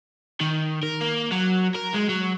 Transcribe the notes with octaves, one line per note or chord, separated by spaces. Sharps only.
D#3
A#4
A#3
F#3
A#4
G#3
F#3